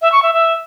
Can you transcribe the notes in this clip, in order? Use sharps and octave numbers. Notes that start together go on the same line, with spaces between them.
E5
C#6
E5
E5